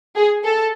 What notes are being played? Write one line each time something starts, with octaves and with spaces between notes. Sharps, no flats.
G#4
A4